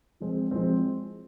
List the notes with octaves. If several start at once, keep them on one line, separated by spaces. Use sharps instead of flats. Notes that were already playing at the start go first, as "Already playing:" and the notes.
F3 G#3 C4
F3 G#3 C4